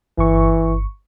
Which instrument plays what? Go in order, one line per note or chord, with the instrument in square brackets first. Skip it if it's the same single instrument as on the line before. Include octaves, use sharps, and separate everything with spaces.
[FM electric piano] G1 C#6 [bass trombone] E3